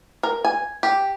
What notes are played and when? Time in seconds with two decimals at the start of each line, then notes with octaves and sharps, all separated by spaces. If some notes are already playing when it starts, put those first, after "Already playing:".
0.23 A#4
0.45 G#5
0.83 G4